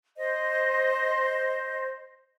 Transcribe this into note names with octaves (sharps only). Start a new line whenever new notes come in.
C5 D#5